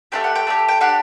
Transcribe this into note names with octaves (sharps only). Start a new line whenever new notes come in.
A3 D4 G4 G5
F#5
G5
A3 D4 G4
G5
D4 G4 F#5